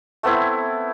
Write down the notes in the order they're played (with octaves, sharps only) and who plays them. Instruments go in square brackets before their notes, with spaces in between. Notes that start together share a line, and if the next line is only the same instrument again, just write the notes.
[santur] A3 B3 C4 E4